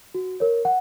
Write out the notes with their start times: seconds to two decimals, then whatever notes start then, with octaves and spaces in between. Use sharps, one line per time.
0.14 F#4
0.40 A#4 C#5
0.65 F#5